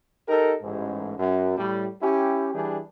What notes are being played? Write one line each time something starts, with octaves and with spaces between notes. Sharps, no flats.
D#4 G4 A4 A#4
A1 G#2
F#2
A2 G3
C#4 E4 G4
E3 G3 D4 G4 G#4